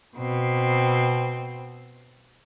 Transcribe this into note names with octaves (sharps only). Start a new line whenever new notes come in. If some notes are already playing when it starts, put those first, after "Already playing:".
B2 C4